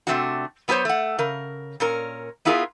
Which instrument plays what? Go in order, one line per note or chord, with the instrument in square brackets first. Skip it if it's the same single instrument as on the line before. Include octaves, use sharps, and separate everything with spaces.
[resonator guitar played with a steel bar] C3 D#3 A3 C4 D4 F#4
F#3 B3 F4 F#4 C5 C#5
A3 F#5
C#3 A#4
A#2 C#4 A#4
B3 E4 F4 G#4 A#4